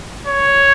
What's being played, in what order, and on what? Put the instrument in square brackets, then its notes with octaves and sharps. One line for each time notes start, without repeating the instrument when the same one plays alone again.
[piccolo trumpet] C#5